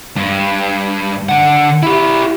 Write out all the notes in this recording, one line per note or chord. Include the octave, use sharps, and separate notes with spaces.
G2
D3 F#5
E4 G4